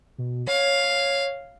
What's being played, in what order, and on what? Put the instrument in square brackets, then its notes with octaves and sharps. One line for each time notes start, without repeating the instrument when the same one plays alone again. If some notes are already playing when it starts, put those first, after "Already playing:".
[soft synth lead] B2
[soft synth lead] C#5 [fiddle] F5